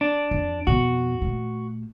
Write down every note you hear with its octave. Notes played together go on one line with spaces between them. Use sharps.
D4
F2
F2 B2 F#4
A#2 A3